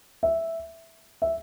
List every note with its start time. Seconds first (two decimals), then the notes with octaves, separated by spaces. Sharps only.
0.23 E5
1.22 E5